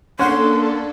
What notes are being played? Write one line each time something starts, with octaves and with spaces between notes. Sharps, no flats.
A#3 C#4 D4 A4 F#5 C6